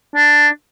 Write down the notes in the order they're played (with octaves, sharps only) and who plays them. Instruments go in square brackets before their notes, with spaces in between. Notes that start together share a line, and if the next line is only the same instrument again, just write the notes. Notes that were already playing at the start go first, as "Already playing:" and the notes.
[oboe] D4